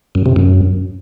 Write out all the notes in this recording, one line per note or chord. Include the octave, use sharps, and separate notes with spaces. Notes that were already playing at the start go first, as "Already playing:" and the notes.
F#2
C3
F#2